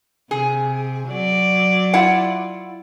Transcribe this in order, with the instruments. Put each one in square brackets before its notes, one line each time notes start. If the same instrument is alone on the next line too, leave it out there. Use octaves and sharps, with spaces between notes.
[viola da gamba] C3 [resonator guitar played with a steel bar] G#4
[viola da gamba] F#3 D5
[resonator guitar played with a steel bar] E4 F4 F#5